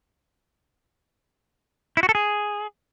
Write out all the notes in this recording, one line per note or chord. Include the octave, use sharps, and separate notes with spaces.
E4
F#4
A4
G#4